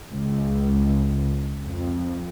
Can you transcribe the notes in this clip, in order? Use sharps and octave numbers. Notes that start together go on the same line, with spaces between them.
C#2
F2